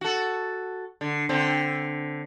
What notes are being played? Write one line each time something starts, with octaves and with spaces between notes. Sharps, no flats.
F#4 A4
D3
D3 C4